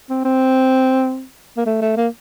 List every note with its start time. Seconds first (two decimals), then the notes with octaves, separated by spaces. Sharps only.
0.10 C4
0.25 C4
1.57 A#3
1.66 A3
1.82 A3
1.97 A#3